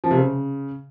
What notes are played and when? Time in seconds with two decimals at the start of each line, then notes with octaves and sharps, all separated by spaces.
0.04 F3
0.11 C3
0.18 C#3